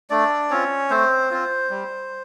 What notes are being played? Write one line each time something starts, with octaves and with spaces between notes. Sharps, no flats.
A3 D4 D5
C4 C#4 F4 C#5
A3 C4 C5
C4 F4
G3